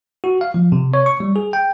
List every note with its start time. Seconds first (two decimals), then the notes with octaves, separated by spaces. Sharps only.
0.24 F#4
0.41 F5
0.54 F3
0.72 C3
0.94 C#5
1.06 C#6
1.20 G3
1.36 G#4
1.53 G5